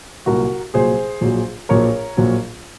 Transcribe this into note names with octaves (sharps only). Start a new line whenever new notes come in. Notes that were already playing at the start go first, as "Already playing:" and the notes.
C2 A#2 F#3 F#4 A#4
C2 A#2 F#3 G#4 C5
A#1 A#2 F#3
A#1 A#2 F#3 A#4 C#5
A#1 A#2 F#3